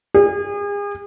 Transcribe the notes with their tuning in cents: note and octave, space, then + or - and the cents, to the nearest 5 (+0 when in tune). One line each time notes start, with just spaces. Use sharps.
G#4 -35